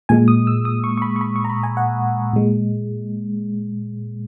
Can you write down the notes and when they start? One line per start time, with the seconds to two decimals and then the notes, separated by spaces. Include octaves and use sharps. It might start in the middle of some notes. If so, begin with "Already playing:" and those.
0.09 A#2 G#3 G#5
0.28 D#6
0.47 E6
0.65 D#6
0.84 C#6
0.98 C#6
1.02 B5
1.16 C#6
1.21 B5
1.36 C#6
1.45 A#5
1.50 B5
1.63 G#5
1.77 F#5
2.33 A#2 G#3